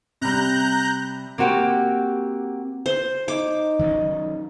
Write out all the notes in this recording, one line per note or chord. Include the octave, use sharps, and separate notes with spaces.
C3 G3 A#5 F#6 G6
A#3 C4 F#4 G4
C5
D#4 D6
D#3 F#3 C#4